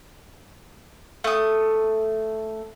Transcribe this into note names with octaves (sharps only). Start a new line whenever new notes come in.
A3 D#6